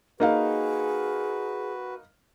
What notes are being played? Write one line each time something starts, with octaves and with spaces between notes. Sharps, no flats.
A#3 D#4 F#4 G#4 B4 F5